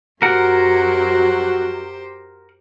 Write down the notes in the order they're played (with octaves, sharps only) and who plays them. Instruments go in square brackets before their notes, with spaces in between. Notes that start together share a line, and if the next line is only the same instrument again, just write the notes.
[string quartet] F#2 F#3 [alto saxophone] F#4 [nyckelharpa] G4 C5 [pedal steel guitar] A#4 F#5